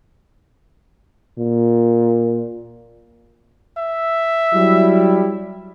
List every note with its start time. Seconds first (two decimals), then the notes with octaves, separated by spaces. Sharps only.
1.38 A#2
3.78 E5
4.54 F#3 G3 E4